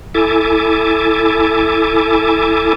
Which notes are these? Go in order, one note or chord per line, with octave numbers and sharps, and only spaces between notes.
E4 A4 G#5 D6